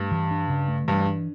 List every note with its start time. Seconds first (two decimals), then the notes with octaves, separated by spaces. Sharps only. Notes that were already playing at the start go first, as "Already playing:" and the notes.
Already playing: G2 A3
0.11 E3
0.31 D4
0.50 C#3
0.68 A3
0.88 G2 E3
1.07 D4